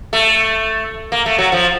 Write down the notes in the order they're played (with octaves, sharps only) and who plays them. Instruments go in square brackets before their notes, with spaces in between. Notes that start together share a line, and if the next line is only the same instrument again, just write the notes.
[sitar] A3
A#3
A3
F#3
F3